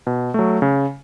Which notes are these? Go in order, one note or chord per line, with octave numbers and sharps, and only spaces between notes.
B2
F#3 A3
C#3